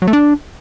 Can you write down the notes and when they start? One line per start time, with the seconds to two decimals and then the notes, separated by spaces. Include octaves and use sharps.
0.02 F#3
0.07 A3
0.13 D4